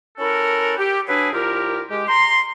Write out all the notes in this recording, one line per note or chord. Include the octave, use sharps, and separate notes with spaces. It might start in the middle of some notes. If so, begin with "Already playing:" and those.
C#4 E4 F#4 A4 A#4
G4
F#3 D4 E4 G#4 B4
C2 F4 G4 A#4
G#3 G4
A#5 C6